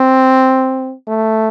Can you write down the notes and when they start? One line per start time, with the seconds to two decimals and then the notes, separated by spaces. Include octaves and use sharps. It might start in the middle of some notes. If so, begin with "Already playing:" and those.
Already playing: C4
1.08 A3